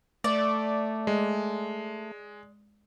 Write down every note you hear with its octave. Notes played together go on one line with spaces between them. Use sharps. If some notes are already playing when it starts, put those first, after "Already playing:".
A3 D5
G#3